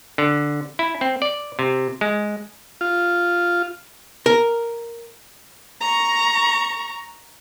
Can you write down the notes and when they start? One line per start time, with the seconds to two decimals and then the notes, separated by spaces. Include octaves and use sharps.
0.18 D3
0.79 E4
1.01 C4
1.22 D5
1.59 C3
2.01 G#3
2.81 F4
4.26 A#4
5.81 A#5 C#6